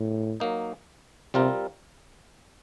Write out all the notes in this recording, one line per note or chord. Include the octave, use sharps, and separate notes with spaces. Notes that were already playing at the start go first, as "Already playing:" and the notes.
Already playing: A2
F#3 A#3 D#4
C3 G3 C4 F4 A#4